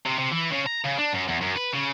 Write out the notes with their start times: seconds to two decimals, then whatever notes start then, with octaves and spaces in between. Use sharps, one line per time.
0.06 C3
0.18 C3
0.32 E3
0.50 C#3
0.66 A#5
0.84 C#3
0.98 D4
1.13 F#2
1.28 E2
1.41 F#2
1.56 B4
1.73 C#3